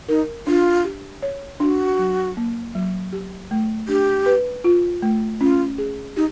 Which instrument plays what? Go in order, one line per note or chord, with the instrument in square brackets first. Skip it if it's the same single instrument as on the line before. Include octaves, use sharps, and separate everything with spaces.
[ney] D#4 [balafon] A#4
[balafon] D4 [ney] F4
[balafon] G4
C#5
[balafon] D4 [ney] F#4
[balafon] F#3
A#3
F#3
G4
A3
[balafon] D4 [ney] G4
[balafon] B4
F4
A3
[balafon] C#4 [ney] F4
[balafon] G#4
[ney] D#4 [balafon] G4